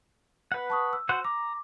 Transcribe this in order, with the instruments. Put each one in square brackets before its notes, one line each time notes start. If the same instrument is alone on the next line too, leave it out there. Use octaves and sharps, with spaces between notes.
[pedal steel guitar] B4 F#5
[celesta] A5 C#6 D#6
E6
[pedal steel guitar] F#4 C5 F#5
[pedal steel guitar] A#5 [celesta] D6